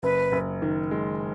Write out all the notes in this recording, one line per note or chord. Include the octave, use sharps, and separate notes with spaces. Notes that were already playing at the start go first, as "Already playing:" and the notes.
F#1 B4
F#1
D#3
G#3